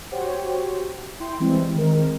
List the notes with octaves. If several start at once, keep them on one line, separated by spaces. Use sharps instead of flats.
F#4 G4 C5 C#5 G5
E4 G5 C6
E3 G3 G#3 C4 E4
D#3 G#3 C4 A#4